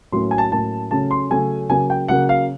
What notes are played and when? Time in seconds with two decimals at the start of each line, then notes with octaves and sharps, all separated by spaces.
0.12 A2 F#3 A#3 C#4 C6
0.31 G#5
0.38 A5
0.52 A2 F#3 A#3 C#4 A5
0.91 C#3 F#3 A3 C#4 A5
1.11 C6
1.30 C#3 F#3 A3 C#4 G#5
1.70 C#3 F#3 A#3 G#5
1.90 G5
2.08 C#3 F#3 A#3 F#5
2.29 F5